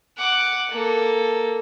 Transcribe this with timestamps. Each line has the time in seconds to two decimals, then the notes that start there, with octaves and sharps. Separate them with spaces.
0.18 F#5 D6
0.71 A#3 A4